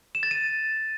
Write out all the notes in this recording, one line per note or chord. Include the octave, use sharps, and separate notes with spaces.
E7
A6
D#7